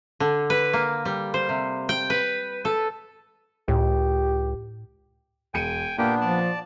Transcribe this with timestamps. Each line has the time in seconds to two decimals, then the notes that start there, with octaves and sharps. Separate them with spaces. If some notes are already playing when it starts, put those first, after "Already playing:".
0.20 D3
0.50 B4
0.73 A#3
1.05 G3
1.34 C5
1.49 C3
1.89 G5
2.10 B4
2.65 A4
3.68 C#2 A2 G4
5.54 E1 G5 G#5 C#7 D#7
5.98 A#2 A#3 B3 D4 G4 G5
6.21 F3 D5 A5